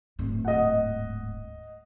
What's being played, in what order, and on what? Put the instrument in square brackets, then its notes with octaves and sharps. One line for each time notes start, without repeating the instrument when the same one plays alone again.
[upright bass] D1 G#2
[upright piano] D#5 F#5